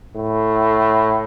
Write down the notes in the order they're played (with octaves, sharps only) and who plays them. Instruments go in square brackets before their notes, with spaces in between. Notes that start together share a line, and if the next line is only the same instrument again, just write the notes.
[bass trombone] A2